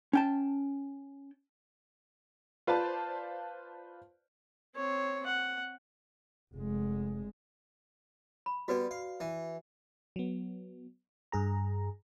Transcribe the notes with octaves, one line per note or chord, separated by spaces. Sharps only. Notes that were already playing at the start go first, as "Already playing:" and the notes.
C#4 G5 A5
F4 B4 C5 D5 A5
C4 C#5
F#5
F1 G#3
B5
G3 B3 F#4 B4 D5
F5
E3
F#3 B3
G2 G#4 A#5